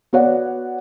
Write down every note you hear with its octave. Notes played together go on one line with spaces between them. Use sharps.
B3 F#4 C#5 D5 F#5